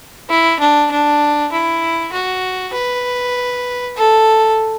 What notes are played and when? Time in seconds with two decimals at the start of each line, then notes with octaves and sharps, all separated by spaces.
0.30 E4
0.60 D4
0.91 D4
1.52 E4
2.12 F#4
2.74 B4
3.97 A4